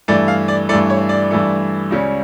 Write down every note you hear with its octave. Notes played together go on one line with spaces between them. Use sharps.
G2 E3 A3 D5
F5
D5
G2 E3 A3 D5
C#5
D5
G2 E3 A3
C#2 C#3 G3 C#4